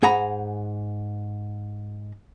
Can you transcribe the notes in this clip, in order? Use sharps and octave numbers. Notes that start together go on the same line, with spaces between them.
G#2 G#4 F#5 A#5 B5